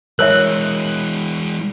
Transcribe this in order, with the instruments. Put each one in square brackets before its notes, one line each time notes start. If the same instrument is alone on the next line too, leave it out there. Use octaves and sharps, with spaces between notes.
[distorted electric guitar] E3 G#3 [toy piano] A#4 C#5 E5 [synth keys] F#6